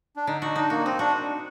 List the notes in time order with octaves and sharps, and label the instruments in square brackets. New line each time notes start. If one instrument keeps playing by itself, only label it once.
[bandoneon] D4
[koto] D3 [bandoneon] D#4
[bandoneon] D#4 [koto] F#4
[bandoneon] D4 [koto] D#4
[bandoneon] A#3 [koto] F#4
[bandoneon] C4 [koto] D#4
[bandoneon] D4 [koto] F#4